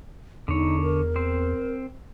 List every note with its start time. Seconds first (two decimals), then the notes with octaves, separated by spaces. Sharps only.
0.48 E2 D3 D#4 C#5
0.82 A#4
1.16 C4 C5